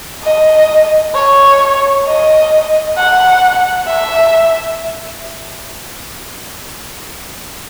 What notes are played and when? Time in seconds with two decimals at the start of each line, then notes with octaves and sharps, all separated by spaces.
0.23 D#5
1.14 C#5
2.06 D#5
2.97 F#5
3.87 E5